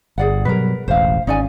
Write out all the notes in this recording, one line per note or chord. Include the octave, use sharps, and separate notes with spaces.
G1 G#4 D5 F#5
B2 F#3 G3 A#4 B4
E1 A1 C5 F5
G#1 C#4 D#4 D5 G#5